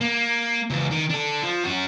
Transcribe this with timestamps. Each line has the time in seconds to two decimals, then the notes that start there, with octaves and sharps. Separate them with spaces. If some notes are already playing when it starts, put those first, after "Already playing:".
0.01 A#3
0.70 C#2 E3
0.91 D#3
1.10 D4 A4
1.42 F3
1.63 C#4 F#4